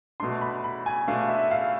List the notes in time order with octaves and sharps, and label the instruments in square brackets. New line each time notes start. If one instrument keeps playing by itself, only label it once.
[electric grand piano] B2 A3 D4 [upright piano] C6
[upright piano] B5
B5
G#5
[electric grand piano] B2 A3 D4 [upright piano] F5
[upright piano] E5
F5